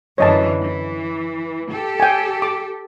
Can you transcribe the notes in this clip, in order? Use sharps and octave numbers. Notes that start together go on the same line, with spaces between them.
F#2 D3 E3 C#5 D#5 A5
E3
G4 A4
G5 G#5
D6